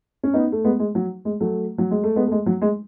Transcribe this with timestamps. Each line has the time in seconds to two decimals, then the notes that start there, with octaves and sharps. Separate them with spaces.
0.23 C#4
0.33 B3 D#4
0.52 A3
0.64 G#3 B3
0.79 G#3
0.95 F#3
1.25 G#3
1.40 F#3 A3
1.78 F#3
1.91 G#3
2.04 A3
2.16 G#3 B3
2.27 A3
2.32 G#3
2.46 F#3
2.62 G#3